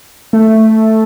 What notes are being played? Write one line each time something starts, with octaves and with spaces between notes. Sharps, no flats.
A3